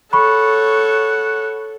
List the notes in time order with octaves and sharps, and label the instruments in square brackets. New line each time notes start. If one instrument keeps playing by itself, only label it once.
[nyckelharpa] A4 C#5 [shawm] F#5 [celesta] B5 C#6